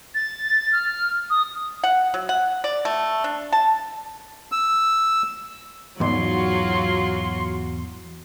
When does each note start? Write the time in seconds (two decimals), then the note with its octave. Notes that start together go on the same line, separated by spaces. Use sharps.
0.15 A6
0.73 F6
1.30 D#6
1.84 F#5
2.14 F#3
2.29 F#5
2.64 D5
2.85 A3
3.24 D4
3.52 A5
4.52 E6
6.00 E2 G#2 F#3 F4 F#4 C6